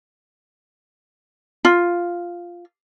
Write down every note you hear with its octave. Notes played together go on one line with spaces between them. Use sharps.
F4